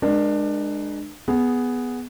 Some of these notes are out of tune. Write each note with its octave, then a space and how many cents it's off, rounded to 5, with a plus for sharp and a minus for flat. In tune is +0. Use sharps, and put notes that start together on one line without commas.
G#3 +0 D4 +25 A#4 +35
B3 +0 G#4 +0